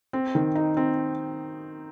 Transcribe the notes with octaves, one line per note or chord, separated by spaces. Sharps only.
C4
D#3
D#4
C4